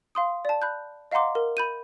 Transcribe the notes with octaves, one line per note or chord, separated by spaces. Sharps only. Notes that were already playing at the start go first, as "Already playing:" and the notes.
F5 C6 D#6
D5 A5
B5 F#6 G6
D#5 F5 F#5 A#5 C6 D6
A#4
B5 G6 D#7